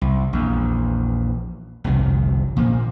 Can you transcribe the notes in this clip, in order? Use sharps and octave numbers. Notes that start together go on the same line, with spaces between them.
C2
A#1 E2
G1 C2 F2 D#3
A#2 F3 A#3